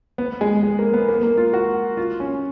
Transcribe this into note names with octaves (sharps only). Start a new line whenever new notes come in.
B3
G#3
G#3
A#3
B3
A#3
A#3
F4
F#4
F4
C#4